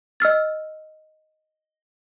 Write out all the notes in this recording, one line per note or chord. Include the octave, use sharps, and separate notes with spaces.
D#5 E6 F6 A6